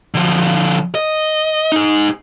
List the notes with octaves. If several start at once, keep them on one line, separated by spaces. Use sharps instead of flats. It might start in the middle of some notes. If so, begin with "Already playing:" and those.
D3 F3
D#5
D#4 G#4